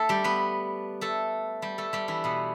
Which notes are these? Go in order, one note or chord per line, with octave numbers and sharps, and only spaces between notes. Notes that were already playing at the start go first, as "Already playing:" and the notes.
Already playing: A3 A4
G3 G4
B3 B4
A3 A4
G3 G4
A3 A4
G3 G4
E3 E4
B2 B3